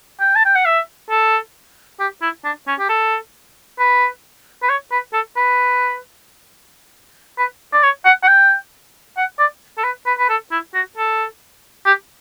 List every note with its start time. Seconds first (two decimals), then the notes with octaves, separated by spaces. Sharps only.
0.20 G5
0.36 A5
0.45 G5
0.55 F#5
0.66 E5
1.10 A4
2.00 G4
2.22 E4
2.45 D4
2.68 C#4
2.80 G4
2.89 A4
3.79 B4
4.63 B4
4.69 C#5
4.92 B4
5.13 A4
5.37 B4
7.38 B4
7.73 D5
7.83 C#5
8.05 F#5
8.23 F#5
8.28 G5
9.17 F#5
9.39 D5
9.78 A4
9.84 B4
10.07 B4
10.19 B4
10.29 A4
10.51 E4
10.74 F#4
10.97 A4
11.86 G4